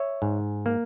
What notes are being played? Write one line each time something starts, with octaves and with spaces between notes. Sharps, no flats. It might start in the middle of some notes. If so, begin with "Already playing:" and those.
Already playing: C#5 E5
G#2
A#3